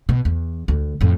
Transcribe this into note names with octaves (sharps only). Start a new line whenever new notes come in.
B2
E2
D2
F2 A2